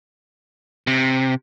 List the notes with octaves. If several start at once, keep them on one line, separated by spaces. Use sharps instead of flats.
C3